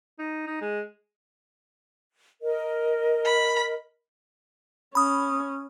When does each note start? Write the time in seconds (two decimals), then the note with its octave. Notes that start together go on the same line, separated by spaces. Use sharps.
0.19 D#4
0.47 D#4
0.62 G#3
2.41 A#4 D#5
3.25 B5
4.95 C#4 B5 D#6